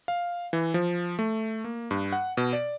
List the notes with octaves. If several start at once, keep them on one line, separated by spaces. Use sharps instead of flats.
F5
E3
F3
A3
A#3
G2
F#5
B2
D5